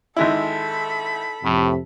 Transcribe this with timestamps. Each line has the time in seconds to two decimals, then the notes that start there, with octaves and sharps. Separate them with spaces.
0.17 G#1 G#3 E4 A4 B5
1.44 F2 A2 C3